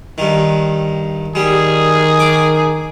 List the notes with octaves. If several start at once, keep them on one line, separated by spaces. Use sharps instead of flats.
G2 D#3
D#3 G3 G#4
D6